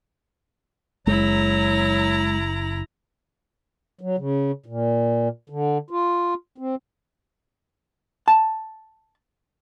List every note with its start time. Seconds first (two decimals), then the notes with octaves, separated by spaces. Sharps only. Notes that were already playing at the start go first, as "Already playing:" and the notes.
1.07 F#1 F#3 G#3 E4 A#5
4.01 F#3
4.18 C#3
4.66 A#2
5.50 D3
5.90 F4
6.58 C4
8.28 A5